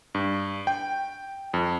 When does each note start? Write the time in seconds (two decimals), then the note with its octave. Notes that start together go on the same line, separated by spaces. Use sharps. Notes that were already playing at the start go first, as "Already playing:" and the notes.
0.15 G2
0.67 G5
1.54 F2